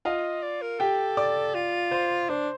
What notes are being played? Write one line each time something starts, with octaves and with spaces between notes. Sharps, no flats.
F4 D#5 F5
D5
A#4
G4 A4 G5
D5 D6
F4
C5 C6
D4 C5 C6